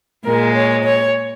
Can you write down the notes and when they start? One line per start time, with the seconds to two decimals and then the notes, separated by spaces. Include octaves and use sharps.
0.24 A#2 G#3 A#4
0.54 C#5
0.84 C#5